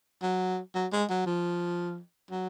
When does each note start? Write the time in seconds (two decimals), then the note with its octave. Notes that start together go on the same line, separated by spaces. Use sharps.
0.22 F#3
0.75 F#3
0.92 G#3
1.10 F#3
1.27 F3
2.31 F#3